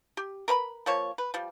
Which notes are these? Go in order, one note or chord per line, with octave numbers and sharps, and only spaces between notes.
G4
A#4 B4 A#5 B5
F3 A#3 C#5
B4
F3 G3